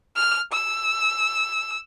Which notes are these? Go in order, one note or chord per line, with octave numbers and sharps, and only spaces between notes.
F6
E6